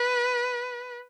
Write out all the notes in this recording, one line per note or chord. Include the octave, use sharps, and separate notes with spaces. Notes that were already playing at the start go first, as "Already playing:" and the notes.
Already playing: B4